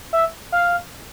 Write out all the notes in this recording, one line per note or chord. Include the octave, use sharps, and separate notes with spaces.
E5
F5